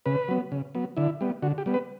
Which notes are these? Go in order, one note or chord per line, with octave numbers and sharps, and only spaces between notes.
C#3 B4
F#3 B3
C#3
F#3 B3
D3 E4
G3 B3
D3 F#4
G4
G3 B3
B4